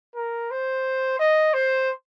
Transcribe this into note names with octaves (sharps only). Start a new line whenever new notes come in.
A#4
C5
D#5
C5